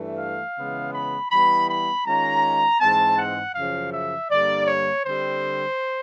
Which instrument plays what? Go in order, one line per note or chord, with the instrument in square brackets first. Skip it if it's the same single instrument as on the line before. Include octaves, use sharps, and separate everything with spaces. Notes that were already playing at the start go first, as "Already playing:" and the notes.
Already playing: [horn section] G2 E3 A3
F5
C#3 E3 G#3 B3
B5
E3 G3 B3 E4 B5
B5
D#3 G#3 C#4 F4 A#5
G#2 E3 G#3 C4 A5
F#5
F#2 C#3 F3 F5
E5
G2 D3 G3 A#3 D5
C#5
D3 G3 C4 C5